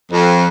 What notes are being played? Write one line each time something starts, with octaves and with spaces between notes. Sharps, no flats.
F2